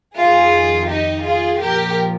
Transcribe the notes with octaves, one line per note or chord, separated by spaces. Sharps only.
F2 D#3 F4 G#4
D#4 G4
F4 G#4
A#2 F3 G4 A#4